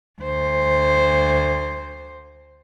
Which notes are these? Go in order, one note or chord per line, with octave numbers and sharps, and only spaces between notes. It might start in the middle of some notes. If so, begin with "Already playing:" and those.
D2 C5